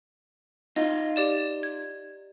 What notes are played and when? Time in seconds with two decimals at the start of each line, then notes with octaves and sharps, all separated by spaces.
0.76 D#4 F4 D#5
1.16 G4 D5 E7
1.63 G#6